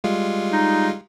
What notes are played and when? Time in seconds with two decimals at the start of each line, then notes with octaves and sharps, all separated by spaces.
0.04 G3 G#3 F4
0.53 D#4